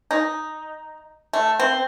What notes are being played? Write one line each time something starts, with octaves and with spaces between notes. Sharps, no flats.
D#4
A3
C4